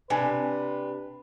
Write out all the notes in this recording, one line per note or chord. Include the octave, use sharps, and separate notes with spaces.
C3 D4 G4 B4 G#5